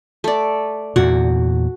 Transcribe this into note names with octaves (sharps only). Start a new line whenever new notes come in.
A3 D5
E2 A#2 F#4